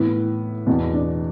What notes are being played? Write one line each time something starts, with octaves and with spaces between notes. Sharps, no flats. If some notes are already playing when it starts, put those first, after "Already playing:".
Already playing: A2 E3 B3
E2 B2
D4